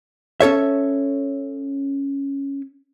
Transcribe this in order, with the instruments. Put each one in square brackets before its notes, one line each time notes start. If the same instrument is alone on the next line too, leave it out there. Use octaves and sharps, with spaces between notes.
[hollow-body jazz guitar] C#4 A4 C#5 E5